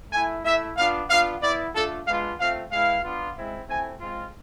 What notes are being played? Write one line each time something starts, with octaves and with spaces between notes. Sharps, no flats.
A3 E4 G#5
A3 E4 E5
B3 D4 F4 F5
B3 D4 F4 F5
B3 E4 D5
A3 D4 F4 A4
G#3 B3 D4 F4 F5
A3 C4 F4 F5
G#3 B3 E4 F5
B3 D4 F4
G#3 C4 E4
A3 C4 E4 G#5
G#3 C4 F4